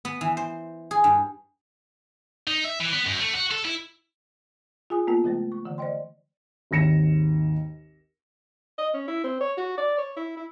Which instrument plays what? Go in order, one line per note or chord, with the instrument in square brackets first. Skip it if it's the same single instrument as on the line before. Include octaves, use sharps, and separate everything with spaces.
[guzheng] B3
E3
C5
G#4
G2
[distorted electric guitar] D#4
E5
E3
B3
F#2
A3
F#4
A4
E4
[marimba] F4 G#4 G#5 D#6
A#3 B3 F4 A#4 G5
C#3 F3 G#3 A3
C#6
D3 E3 F#5
C5 D5 D#5 G5 C6
[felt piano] G#1 D#2 A#6 C#7 E7
[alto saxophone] D#5
C#4
E4
C4
C#5
F#4
D5
C#5
E4
E4